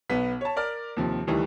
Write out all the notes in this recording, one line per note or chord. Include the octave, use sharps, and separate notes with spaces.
B1 B3 B6
C#5 A5
A#4 D5 F6
D#2 C3 F3
D2 D#3 E3 G3